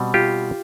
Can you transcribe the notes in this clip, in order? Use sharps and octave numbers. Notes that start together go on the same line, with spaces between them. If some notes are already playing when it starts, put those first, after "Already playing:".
Already playing: B2 G3 C4
F4 G4